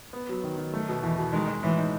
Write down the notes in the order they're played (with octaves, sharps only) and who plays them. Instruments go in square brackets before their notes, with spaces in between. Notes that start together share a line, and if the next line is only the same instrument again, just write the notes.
[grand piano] B3
F#3
D#3
D#3
[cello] F#3 [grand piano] A3
[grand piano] B2
[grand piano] E2 [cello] E3
[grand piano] B2
[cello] D#3 [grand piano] G#3
[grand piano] G#3
[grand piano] A2 [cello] E3
[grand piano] D#4